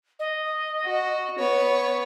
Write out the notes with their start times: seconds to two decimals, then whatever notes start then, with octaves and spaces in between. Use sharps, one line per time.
0.19 D#5
0.84 F#4
1.39 B3 C#5